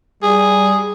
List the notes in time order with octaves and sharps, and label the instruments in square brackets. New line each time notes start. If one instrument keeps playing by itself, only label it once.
[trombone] G3 [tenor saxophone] G#4